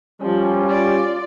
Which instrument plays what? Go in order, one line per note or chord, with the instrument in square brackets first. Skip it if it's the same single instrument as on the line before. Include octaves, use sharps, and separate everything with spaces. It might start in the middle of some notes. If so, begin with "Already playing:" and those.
[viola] F3 [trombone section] G3 C#4
[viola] F4 D5